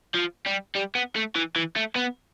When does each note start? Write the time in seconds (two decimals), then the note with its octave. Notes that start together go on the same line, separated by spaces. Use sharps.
0.15 F3
0.46 G3
0.75 G3
0.95 B3
1.16 A3
1.36 E3
1.56 E3
1.76 A3
1.95 B3